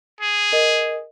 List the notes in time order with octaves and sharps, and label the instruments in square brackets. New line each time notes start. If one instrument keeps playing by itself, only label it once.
[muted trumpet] G#4
[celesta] A#4 D#5